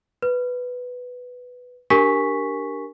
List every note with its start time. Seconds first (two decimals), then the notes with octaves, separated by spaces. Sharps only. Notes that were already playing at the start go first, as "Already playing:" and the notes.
0.22 B4
1.90 D4 G4 A#4 G#5 C#6 B6